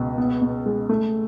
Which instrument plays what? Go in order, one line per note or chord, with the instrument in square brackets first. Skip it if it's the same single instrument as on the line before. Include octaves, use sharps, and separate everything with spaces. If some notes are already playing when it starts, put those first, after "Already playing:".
Already playing: [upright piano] C#2 B2
B3
B2
G#3
A3